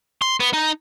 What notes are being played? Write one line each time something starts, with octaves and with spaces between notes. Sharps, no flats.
C6
B3
D#4